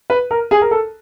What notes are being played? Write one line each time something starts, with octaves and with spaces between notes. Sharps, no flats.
B4
A#4
G#4
A#4
A4